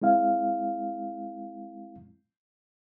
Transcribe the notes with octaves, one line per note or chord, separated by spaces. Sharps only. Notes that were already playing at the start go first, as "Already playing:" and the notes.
G#3 C4 E4 F5